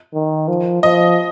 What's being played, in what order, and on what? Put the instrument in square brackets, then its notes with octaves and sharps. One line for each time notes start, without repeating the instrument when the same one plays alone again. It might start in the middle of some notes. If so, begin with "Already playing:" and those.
[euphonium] D#3
F3
[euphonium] F3 [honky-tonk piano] D#5